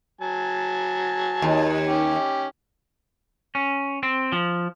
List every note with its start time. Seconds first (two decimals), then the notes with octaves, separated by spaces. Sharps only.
0.21 F#3 G#5 A5
1.42 D#2
1.87 C#4 G4
3.55 C#4
4.03 C4
4.32 F3